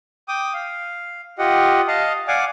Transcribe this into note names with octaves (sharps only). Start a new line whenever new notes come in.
G5 D6 D#6
F5
F4 G4 D#5 F#5
D#5 F5 A5
D5 F5 F#5 G#5 D6